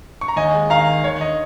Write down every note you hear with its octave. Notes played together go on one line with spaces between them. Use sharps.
C#6
A#5
D#2 D#5 G#5
G#3
D#3 F5 A#5
D#3
D#2 C#5
D#2 D#5